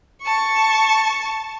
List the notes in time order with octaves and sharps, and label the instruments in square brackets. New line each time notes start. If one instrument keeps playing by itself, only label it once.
[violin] A5 C#6